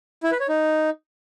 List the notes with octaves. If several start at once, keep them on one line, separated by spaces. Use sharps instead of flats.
E4
B4
C#5
D#4